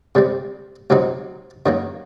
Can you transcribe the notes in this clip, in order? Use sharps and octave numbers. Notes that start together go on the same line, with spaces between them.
C3 G3 C4
C2 C3 F#3 C4 D#4
F#2 D#3 F#3 A#3